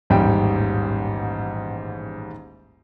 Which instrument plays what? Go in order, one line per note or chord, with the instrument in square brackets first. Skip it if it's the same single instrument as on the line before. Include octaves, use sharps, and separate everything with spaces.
[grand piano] D#1 A1 G#2 G3 G5